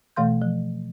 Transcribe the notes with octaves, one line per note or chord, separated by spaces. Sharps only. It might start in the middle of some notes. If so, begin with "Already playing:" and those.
B2 E3 A3 F5 C6 G6
F3